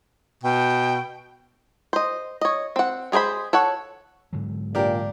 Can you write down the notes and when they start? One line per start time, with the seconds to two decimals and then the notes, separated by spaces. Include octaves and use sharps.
0.43 B2 G5
1.93 C5 D#5
2.41 C#5 D#5
2.76 C4 F#5
3.12 G#3 G#4 A#4 C5 B5
3.53 A4 C#5 F#5
4.33 G#2 D3 F#3
4.75 A#2 D4 G4 A#4